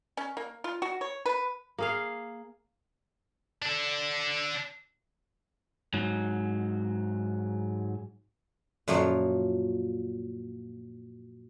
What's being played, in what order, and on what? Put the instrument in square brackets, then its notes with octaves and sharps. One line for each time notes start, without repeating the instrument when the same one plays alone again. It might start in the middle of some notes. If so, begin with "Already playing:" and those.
[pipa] C#4
A#3
F4
F#4
C#5
B4
[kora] A#3 G#4 F5
[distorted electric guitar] D4 A4
[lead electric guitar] G#2 F#3
[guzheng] F#2 A#2 F3 F#3 F4